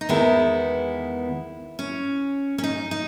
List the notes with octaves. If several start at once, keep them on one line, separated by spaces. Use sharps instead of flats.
D#4
E2 D#3 G#3 B3 E4
C#4
C#4
D#4
D#4